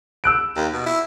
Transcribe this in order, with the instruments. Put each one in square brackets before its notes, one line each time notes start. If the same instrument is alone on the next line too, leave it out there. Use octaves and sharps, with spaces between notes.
[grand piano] E6 F#6 D7
[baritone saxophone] D#2
B2
E4